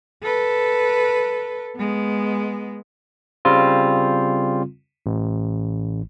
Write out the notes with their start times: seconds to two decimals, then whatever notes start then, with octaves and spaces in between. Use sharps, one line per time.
0.23 A4 B4
1.76 G#3 B3
3.45 C#3 G3 C4 F4
5.06 A1